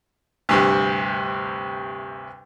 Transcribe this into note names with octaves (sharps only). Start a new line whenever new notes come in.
D2 G2 C3